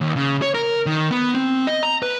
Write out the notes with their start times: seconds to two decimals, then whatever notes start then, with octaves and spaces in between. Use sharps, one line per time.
0.01 D#2
0.16 C#3
0.42 C#5
0.54 A#4
0.86 D#3
1.11 B3
1.35 C4
1.67 D#5
1.83 A#5
2.03 B4